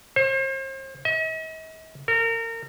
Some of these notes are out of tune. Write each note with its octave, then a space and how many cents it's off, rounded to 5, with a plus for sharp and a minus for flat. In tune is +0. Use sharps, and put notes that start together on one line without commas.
C5 +40
D#5 +45
A#4 -30